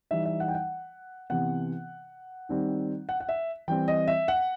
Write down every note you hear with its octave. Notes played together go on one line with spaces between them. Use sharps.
E3 G3 D#4 E5
E5
F#5
G5
F#5
C3 E3 B3 F#5
D#3 G3 C4
F#5
F#5
E5
E3 G3 C4 G5
D#5
E5
F#5